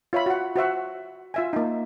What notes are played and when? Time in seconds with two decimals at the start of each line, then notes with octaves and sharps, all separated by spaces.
0.13 F4 C#5 E5 B5
0.26 F#4 F#5
0.56 F#4 C5 E5 F#5
1.34 F4 E5 G#5
1.53 A#3 D#4